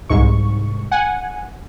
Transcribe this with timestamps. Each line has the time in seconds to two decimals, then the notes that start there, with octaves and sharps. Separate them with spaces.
0.10 C2 G#2 C#6
0.92 F#5 G#5